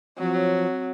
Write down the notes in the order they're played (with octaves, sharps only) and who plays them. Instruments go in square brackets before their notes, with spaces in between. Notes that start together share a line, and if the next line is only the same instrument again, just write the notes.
[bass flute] F3 [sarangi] F#3 [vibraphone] C4 C#5